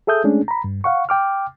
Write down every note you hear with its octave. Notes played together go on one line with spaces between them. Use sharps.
G#4 A4 E5 D#6 G6
G#3 A3 C#4 D4 G#4
A#5 B5
G2
F5 F#5 C#6
G5 D6 F6